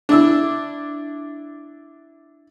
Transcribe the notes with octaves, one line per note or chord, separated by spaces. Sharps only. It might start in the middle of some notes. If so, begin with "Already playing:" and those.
D4 E4 E6